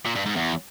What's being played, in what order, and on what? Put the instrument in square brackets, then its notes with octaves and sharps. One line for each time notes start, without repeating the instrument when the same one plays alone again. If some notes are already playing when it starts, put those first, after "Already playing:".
[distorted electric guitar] A#2
G2
G#2
E2